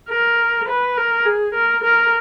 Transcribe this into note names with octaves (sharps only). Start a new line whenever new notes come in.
A#4
B4
A#4
G#4
A#4
A#4